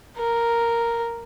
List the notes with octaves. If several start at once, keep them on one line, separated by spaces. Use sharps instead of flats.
A#4